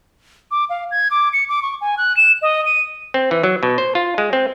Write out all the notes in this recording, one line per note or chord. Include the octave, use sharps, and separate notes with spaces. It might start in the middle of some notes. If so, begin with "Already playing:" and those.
D6
F5
G#6
D6
C#7
D6
C#6
G#5
F#6
E7
D#5
D#7
C4
E3
F#3
B2
C5
F4
G#3
C4